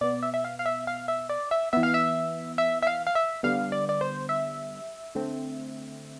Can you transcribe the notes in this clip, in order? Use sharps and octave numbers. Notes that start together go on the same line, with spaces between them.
B2 B3 D5
E5
E5
F5
F5
E5
F5
E5
D5
E5
E3 B3 E5
F5
E5
E5
E5
F5
F5
E5
D3 G3 B3 F5
D5
D5
C5
E5
D3 A3 C4